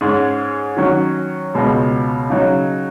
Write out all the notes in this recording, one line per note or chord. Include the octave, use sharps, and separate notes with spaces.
G#2 G#3 C#4 G#4
D#3 F#3 C#4 F#4
C#2 B2 G#3
C#3 F#3 D#4